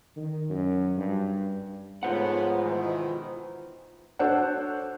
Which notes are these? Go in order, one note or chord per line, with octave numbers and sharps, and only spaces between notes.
D#3
F#2
G2
G#2 A3 B3 F4 C5 C#5 F#5
B2 D#3 E3
D4 F#4 A4 C5 C#5 F#5